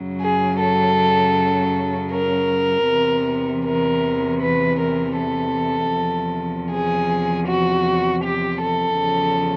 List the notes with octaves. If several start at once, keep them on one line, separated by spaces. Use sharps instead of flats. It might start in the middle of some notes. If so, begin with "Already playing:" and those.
Already playing: F#2 C#3 F#3
G#4
A4
A#4
E2 C3 E3
A#4
B4
A#4
A4
E2 C3 F3
G#4
F#4
G4
A4
E2 C#3 F3